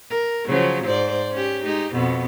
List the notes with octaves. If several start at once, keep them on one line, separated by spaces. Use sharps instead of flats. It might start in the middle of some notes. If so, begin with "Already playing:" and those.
A#4
C#3 F3 F#3
G#2 C5 D5
C#4 G4
G#3 D#4 G4
F2 B2 B3